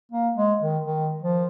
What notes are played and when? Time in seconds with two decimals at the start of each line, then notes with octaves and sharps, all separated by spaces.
0.12 A#3
0.36 G#3
0.61 D#3
0.85 D#3
1.23 F3